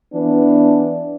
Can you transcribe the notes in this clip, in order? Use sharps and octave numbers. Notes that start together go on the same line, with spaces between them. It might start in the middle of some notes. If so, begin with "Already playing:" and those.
E3 B3 D4